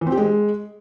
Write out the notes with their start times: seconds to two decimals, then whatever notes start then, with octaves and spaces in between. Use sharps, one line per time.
0.01 E3
0.07 C4
0.12 G4
0.17 G#3